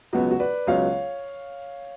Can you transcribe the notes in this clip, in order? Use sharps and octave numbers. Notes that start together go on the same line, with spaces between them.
C#2 B2 F#3 B3 F#4
F#4
B4 D5
C#2 B2 F#3 B3 C#5 F5